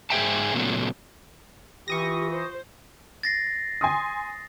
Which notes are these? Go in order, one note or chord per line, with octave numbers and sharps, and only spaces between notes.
G#2 G#4 C5 E5 G5 A5
A#2 C#3 F#3 A3 B3
E3 F4 G4 C#6 D#6 A#6
C5
A6 A#6 C7
G#5 C6 D#6